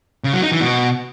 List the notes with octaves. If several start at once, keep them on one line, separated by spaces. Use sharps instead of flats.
C#3
F#3
D#4
E3
B2